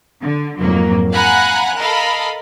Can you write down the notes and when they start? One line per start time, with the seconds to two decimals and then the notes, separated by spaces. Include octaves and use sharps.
0.20 D3
0.58 F2 G#2 F#3 A#3
1.13 F5 F#5 G#5 A#5 B5 F#6
1.78 A4 A#4 D#5 F5 B5